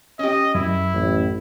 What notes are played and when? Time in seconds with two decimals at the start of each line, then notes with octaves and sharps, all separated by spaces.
0.19 C#4 G4 D#5
0.55 F#2 E4
0.93 A1